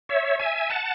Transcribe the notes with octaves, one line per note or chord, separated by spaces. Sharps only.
C#5 E5
E5 G#5
F#5 A5